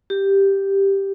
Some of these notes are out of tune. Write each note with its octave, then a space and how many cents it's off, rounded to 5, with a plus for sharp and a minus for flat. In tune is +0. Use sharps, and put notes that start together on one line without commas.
G4 +0